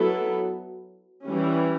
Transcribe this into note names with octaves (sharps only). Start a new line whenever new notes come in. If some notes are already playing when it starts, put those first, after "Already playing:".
Already playing: F#3 B3 E4 A4
E3 G3 C#4